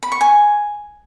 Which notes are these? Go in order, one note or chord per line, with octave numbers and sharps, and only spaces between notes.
B5
C#6
G#5